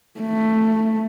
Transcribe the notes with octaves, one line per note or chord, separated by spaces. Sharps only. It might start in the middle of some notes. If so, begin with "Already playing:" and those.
A3